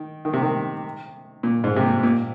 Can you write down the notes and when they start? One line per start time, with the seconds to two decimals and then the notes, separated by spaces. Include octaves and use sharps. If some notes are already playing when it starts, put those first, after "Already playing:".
Already playing: D#3
0.25 D#3
0.33 C3
0.42 D#3
1.43 A#2
1.64 G#2
1.76 C3
1.83 A#2
2.03 A#2